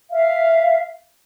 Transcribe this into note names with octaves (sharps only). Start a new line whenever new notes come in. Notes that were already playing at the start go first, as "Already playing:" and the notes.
E5 F5